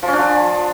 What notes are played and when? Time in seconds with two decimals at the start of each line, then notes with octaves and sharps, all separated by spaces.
0.03 F3
0.08 C#4
0.13 D4
0.18 F3